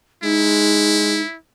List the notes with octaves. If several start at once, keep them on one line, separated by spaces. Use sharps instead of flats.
G#3 D#4 E4